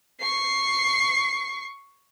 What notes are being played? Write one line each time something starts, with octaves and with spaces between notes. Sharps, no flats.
C#6 C7